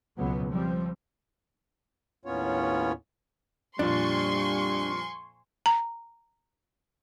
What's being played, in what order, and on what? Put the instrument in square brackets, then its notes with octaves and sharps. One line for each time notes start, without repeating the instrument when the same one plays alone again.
[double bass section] C#2 B2 F#3 B3
F3 G3 C4
[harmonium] D#2 A2 B3 C#4 F4 C#5
[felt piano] F2 A#2 [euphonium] G3 [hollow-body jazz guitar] D4 [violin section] G#5 C6 C#6
[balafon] A#5